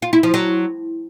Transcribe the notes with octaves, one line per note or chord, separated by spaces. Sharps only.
F4
E4
F3
F#3